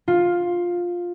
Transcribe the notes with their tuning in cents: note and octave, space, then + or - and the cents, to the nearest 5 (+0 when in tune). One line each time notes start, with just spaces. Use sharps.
F4 +10